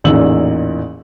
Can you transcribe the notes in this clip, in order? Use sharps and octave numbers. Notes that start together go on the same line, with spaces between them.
A1 E2 A#2 D#4 E6 F#7